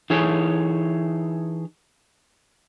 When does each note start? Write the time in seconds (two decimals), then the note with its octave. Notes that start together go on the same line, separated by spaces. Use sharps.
0.10 E3 D#4 G#4 A4 C#5